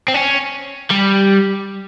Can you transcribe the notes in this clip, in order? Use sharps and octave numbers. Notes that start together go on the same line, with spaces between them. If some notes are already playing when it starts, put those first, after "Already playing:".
C4
C#4
G3